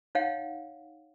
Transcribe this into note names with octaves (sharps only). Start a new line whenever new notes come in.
D#4 C#5 F5 F#5